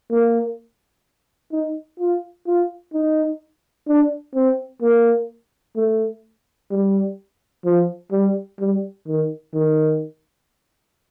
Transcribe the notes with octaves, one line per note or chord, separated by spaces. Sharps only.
A#3
D#4
F4
F4
D#4
D4
C4
A#3
A3
G3
F3
G3
G3
D#3
D#3